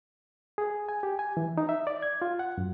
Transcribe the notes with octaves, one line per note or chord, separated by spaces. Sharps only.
G#4
G#5
G4
G#5
E3
D#4
E5
D5
G#6
F4
F#5
F#2